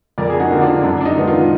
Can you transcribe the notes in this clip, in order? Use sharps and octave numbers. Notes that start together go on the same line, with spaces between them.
F2 A#4 D5
G#4
D#4 F#4
D3 F3 A#3
D4 F4
F#2 D4
D4
D#4
D#3 G#3 B3
D4 F4